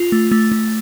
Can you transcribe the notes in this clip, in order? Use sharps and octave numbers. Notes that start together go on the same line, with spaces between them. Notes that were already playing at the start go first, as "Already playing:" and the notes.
Already playing: F4
A3
A3
A3